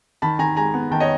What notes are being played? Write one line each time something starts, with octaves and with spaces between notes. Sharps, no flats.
D#3 A5 B5
D#3 G#5 A#5
G#3 G#5 A#5
B3
D#3 G5 A5
C#5 D#5